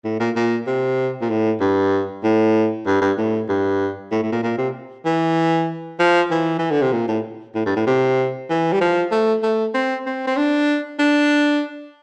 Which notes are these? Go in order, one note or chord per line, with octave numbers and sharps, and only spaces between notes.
A2
A#2
A#2
C3
A#2
A2
G2
A2
G2
G2
A2
G2
A2
A2
A#2
A#2
C3
E3
F3
E3
E3
D3
C3
A#2
A2
A2
G2
A2
C3
E3
G3
F3
A3
A3
C4
C4
C4
D4
D4